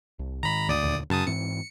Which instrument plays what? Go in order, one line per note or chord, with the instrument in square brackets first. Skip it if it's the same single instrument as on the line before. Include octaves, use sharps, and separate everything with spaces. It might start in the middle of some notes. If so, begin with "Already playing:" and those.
[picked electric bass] C2
[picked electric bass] G#2 D#3 [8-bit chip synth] A#5 B5
[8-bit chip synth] D2 D5 D#6
[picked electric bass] D#2 A#2 D3
[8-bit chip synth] F#2 A5 D#6 [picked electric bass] C#3
[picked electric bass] G#2 E3 C4 [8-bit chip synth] C#7